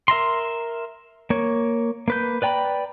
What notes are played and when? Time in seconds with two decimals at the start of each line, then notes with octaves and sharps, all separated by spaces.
0.08 A#4 E5 A#5 C6
1.30 A#3 C#5
2.08 A#3 B4 G6
2.42 B4 D5 G5 A#5 B5